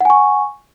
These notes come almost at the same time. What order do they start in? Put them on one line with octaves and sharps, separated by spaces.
F#5 G#5 C#6